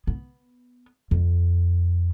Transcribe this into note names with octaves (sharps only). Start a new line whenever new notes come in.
B3
F2